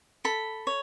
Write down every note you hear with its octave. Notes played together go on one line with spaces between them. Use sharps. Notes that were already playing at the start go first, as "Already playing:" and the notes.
A4 B5
C#5